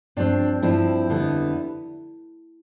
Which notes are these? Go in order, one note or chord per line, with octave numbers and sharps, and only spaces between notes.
G2 F3 C4 D4
G2 F3 C4 E4
F2 D3 G3 B3